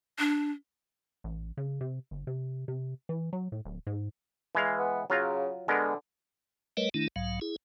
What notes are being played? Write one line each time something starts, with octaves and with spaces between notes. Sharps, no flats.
D4
A1
C#3
C3
G1
C3
C3
E3
F#3
A2
D1
G#2
E3 G#3 F5
B3
C#3 F#3 F4 A#5
D3 G#3 B3 A#4
G3 A3 A#4 B4 C#5 D#5
D#3 A3 D4 E4
B1 G#2 F#3 F5
E4 G#4